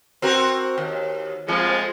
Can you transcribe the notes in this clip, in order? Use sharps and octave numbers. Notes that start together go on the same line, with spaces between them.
C4 F#4 A#4
D#2
F2 F3 G#3